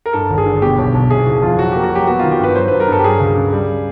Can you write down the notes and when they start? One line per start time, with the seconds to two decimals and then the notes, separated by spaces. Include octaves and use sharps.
0.06 A#4
0.13 G2 A4
0.30 G#1
0.38 G#4
0.46 D3
0.62 B2 G4
0.78 B1
0.94 B1
1.10 C3 G#4
1.27 F#1
1.43 F2 F4
1.58 F#3 F#4
1.71 A#3 G4
1.83 F#4
1.92 F#3 G4
2.07 B3 F#4
2.19 D#3 F4
2.31 G4
2.40 G2 B4
2.55 F#3 C5
2.68 G2 B4
2.80 A#4
2.88 G2 A4
2.99 G4
3.04 F#3 G#4
3.20 C#2
3.36 C#3
3.53 G3